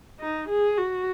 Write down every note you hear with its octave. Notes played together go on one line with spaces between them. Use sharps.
D#4
G#4
F#4